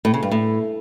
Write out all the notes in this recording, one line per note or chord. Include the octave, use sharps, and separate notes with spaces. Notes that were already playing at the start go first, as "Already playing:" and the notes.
A2
C#3
G2
A2